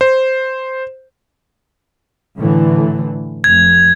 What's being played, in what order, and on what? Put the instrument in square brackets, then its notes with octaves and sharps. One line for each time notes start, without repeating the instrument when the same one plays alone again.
[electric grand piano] C5
[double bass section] A2 D3 E3
[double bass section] F1 [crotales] G#6